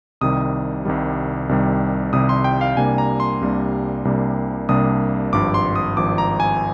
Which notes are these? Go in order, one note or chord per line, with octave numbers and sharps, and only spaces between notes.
C2 C3 D#3 G3 D#6
C2 C3 D#3 G3
C2 C3 D#3 G3
C2 C3 D#3 G3 D#6
C6
G5
F5
C2 C3 G3 A#3 D4 G#5
A#5
C6
C2 C3 G3 A#3 D4
C2 C3 G3 A#3 D4
C2 C3 G3 A#3 D4 D#6
G#1 G2 F3 D6
C6
D#6
G#1 G2 F3 D6
A#5
G#5